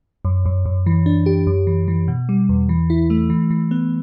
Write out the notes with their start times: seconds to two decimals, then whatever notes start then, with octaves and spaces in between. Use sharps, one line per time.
0.25 F#2
0.46 F#2
0.66 F#2
0.86 E3
1.06 D4
1.26 G4
1.47 F#2
1.67 E3
1.88 E3
2.08 B2
2.29 G3
2.49 E2
2.69 E3
2.90 E4
3.10 A3
3.30 E3
3.50 E3
3.71 B3